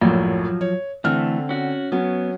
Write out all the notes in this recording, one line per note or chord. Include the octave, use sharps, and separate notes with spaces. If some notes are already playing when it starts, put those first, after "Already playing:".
A#1 F#2 A2 F3 F#3
C#5
D3 E3 A3 C4 F6
C#4 F#4
F#3 B3 C#4